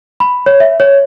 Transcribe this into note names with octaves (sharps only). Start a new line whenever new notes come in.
B5
C#5
E5
C#5